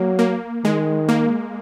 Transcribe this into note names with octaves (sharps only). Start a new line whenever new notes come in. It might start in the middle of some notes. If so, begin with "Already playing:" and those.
Already playing: F#3 A#3
A#3
D#3 G#3
A#3